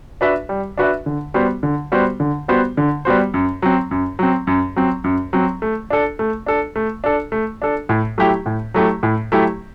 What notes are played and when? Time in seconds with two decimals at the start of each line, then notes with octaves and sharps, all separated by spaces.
0.21 D4 F#4 B4 E5
0.49 G3
0.78 D4 F#4 B4 E5
1.06 D3
1.34 G3 B3 F#4 C5
1.63 D3
1.92 G3 B3 F#4 C5
2.20 D3
2.48 G3 B3 F#4 C5
2.77 D3
3.05 G3 B3 F#4 C5
3.34 F#2
3.62 F#3 C4
3.91 F#2
4.19 F#3 C4
4.47 F#2
4.76 F#3 C4
5.04 F#2
5.33 F#3 C4
5.62 A3
5.90 D4 A4
6.19 A3
6.46 D4 A4
6.76 A3
7.04 D4 A4
7.32 A3
7.62 D4 A4
7.89 A2
8.18 F#3 A3 E4 G4
8.46 A2
8.74 F#3 A3 E4 G4
9.03 A2
9.32 F#3 A3 E4 G4